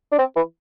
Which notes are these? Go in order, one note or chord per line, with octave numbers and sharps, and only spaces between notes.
D4
C4
E3